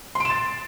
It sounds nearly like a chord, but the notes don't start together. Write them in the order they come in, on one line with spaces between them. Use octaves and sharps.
C6 D7 E7 A6